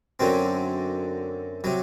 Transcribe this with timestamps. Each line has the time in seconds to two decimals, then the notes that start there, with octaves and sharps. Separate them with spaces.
0.20 F#2 D3 F#3 C4
1.64 C3 F#3